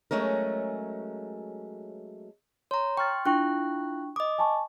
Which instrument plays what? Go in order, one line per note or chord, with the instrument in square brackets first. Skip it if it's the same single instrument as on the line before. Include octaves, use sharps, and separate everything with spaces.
[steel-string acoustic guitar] F#3 G#3 A3 C#4 A#4
[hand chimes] C#5 A#5 [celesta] C6
[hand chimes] G5 C6 [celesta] C#6 F6 A6
[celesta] D4 G5 C#6 [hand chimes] E4 F4 F#6
[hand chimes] D#5 D6 [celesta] D#6
[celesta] G#5 A5 C#6